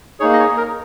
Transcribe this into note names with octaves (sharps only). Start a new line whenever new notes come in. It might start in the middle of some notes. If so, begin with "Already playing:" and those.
A#3 D#4 G#4 C#5
D#5
C#5
A#4